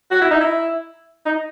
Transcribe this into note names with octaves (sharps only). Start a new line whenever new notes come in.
F#4
E4
D#4
E4
D#4